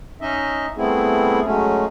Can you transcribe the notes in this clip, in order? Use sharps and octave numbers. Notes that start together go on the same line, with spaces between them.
C#4 D#4 D#5 E5
G3 A3 B3 C4 E4 G#4
F#3 G#3 A3 C#4